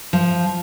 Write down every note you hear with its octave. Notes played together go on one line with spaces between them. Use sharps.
F3